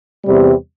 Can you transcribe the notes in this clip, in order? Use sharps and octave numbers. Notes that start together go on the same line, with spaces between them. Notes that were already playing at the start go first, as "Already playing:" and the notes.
E2 C3 G3